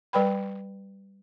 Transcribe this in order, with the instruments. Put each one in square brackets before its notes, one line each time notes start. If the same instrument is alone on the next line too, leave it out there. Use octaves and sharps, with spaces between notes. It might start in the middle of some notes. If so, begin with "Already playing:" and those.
[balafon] G3 B4 G5 B5